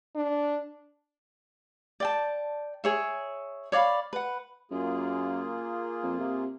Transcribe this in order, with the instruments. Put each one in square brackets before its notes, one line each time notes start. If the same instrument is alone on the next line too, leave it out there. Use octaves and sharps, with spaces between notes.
[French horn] D4
[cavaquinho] D5 G5 A5
G#4 C#5 E5
C#5 D5 F5 B5
B4 F#5
[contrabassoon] F#2 [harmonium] A#3 F4 G#4
[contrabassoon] F2
C3